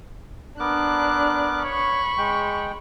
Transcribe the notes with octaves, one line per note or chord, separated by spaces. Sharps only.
B3 D4 A#4 D6 F#6
C#5 B5 C#6
G#3 G5